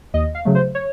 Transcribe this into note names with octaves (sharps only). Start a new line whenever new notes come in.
D#2 D#5
F5
C#3 F#3 A3
C5
C#5